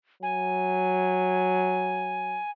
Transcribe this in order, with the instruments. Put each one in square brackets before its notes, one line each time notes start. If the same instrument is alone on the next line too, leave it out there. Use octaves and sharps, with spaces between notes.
[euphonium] F#3 [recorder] G#5